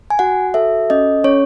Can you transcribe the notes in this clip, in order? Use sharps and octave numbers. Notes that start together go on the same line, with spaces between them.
G#5
F#4 F#5
A4 E5
C#4 D#5
C#4 C#5